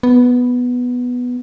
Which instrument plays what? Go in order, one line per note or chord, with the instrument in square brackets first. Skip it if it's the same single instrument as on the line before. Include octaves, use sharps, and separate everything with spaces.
[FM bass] B3